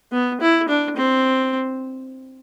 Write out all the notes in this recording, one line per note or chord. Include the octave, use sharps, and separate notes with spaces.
B3
E4
D4
C4